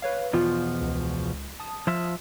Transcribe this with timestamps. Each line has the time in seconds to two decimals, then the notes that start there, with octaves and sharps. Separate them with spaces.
0.02 B4 C#5 F5
0.33 E2 B2 F3 F4
0.81 C#2
1.60 A5 D#6
1.87 F3 F4 E5